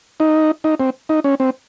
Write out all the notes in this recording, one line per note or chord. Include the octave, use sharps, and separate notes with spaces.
D#4
D#4
C4
D#4
C#4
C4